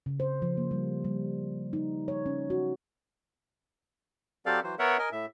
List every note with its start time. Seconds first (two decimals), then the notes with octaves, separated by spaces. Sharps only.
0.06 C#3
0.20 C5
0.42 F3
0.57 A#3
0.71 G3
1.04 G3
1.73 D#4
2.08 C#5
2.26 C#4
2.50 F#4
4.46 F#3 C4 G4 A4 D5 F5
4.63 E3 F#3 C5
4.79 B3 A#4 C#5 E5 F#5
4.99 A#4 D#5 G#5
5.12 A2 E5